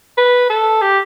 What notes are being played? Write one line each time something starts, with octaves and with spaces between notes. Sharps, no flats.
B4
A4
G4